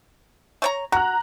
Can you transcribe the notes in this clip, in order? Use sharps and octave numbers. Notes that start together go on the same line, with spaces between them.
A3 C#5 A#5
F#4 A#5 F#6